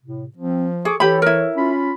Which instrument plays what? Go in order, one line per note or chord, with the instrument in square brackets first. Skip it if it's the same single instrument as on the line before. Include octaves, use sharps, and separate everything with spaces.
[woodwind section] A2 C3
[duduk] F3 [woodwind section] C4
[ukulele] G#4 [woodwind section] A4 C#6 D6
[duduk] E3 [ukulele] G4 B5 [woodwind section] A4 C#5
[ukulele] E4 A#4
[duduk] C#4 [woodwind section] F4 B5